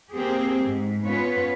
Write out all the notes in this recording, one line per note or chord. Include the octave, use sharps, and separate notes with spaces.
A#3 C4 G4 G#4
G#2
B3 C#4 F4 B4 C#5